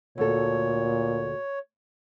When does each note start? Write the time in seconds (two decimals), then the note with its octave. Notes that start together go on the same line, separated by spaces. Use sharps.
0.18 D2 A#2 A4 C#5